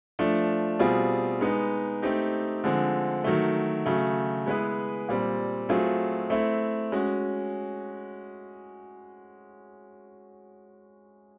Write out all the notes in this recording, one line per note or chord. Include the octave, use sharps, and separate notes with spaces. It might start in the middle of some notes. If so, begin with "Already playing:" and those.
F3 A3 D4
B2 G3 C4 F4 G#4
G#3 B3 D#4
A3 C4 D#4 G4
D3 F3 G#3 C4
D#3 F#3 A3
C#3 F#3 A3
G#3 B3 E4 G#4 B4
A#2 G3 C4
F#3 A3 C4 F4 G#4
A3 C4 E4
G#3 C#4 F#4